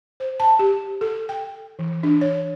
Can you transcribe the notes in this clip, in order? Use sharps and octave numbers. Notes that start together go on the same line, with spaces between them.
C5
A5
G4
A4
G5
E3
D4
C#5